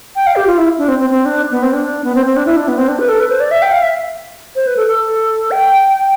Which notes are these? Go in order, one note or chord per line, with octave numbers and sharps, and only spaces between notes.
G5
F5
G4
F4
E4
D4
C4
C4
C4
D4
B3
C4
D4
B3
C4
C4
D4
E4
D4
B3
C4
D4
B4
A4
B4
C5
D5
E5
G5
F5
E5
C5
B4
A4
A4
G5